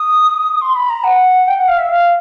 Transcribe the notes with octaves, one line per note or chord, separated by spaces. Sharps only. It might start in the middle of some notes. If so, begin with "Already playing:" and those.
Already playing: D#6
C6
B5
A#5
F#5
G5
F#5
F5
E5
F5